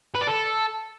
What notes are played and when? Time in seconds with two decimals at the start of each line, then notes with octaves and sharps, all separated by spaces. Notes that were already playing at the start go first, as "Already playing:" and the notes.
0.15 B4
0.21 D5
0.27 A4